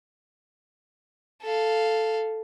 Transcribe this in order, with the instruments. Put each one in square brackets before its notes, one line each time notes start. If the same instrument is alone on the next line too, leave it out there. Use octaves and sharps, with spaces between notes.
[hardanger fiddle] A4 F5